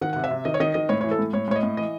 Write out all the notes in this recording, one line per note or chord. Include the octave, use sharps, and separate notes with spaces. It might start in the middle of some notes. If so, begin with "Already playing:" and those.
D#3 F#5
C3 F#5
E5
C3
D#3 D#5
C#5
D#3 D#5
D#3 D#5
A2 C#5
E3 C#5
A4
A2
A2 C#5
A2 C#5
D#5
A2
E3 D#5